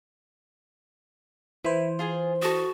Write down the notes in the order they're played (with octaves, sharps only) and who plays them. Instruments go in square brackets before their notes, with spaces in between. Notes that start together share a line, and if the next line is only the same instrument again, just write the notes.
[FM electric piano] E3 C5 [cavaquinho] E4
[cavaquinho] F4 G#4 G#5
[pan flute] F#4 [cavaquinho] A4 D#6